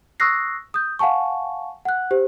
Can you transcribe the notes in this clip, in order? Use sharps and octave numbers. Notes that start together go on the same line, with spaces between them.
C#6 D#6 E6 F#6 A#6 C7
D#6 G6
F5 F#5 G#5 A5 C#6
F#5 F#6
G4 C5